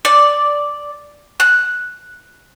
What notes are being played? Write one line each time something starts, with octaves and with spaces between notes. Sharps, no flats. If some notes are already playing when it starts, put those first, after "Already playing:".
D5
F#6